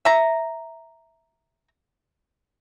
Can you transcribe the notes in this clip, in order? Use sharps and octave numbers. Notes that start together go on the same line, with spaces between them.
E5 A#5